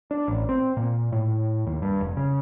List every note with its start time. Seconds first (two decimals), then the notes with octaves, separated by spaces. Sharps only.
0.11 D4
0.28 A1
0.49 C4
0.77 A#2
1.12 A2
1.67 D#2
1.82 G2
2.01 F1
2.17 C#3